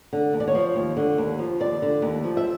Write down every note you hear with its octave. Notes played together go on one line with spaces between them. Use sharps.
D3
D#2
D5
C#5
F3
D#2
D3
D#2
F3
D#2 D5
D3
D#2
F3
E5